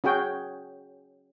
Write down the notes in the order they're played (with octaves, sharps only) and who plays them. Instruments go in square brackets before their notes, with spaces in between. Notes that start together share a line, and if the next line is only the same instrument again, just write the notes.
[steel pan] C#4 F#4 G#4 G5